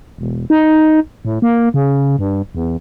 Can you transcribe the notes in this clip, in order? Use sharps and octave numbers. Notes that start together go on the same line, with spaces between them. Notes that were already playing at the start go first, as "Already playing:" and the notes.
E1
D#4
A2
A#3
C#3
G2
E2